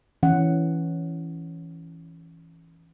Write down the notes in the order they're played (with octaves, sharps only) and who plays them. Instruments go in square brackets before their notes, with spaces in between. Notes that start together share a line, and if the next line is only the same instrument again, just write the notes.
[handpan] E3 C#4 F#5